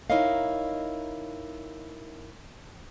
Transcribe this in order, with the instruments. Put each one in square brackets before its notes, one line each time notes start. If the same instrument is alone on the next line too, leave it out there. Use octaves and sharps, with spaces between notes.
[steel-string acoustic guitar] D#4 E4 A#4 C#5 D#5 F5